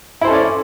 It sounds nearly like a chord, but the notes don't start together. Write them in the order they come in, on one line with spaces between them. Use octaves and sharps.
E4 C5 A4 C#4 D5